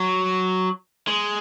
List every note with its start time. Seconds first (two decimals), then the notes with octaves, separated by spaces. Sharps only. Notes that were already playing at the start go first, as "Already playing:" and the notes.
Already playing: F#3
1.08 G#3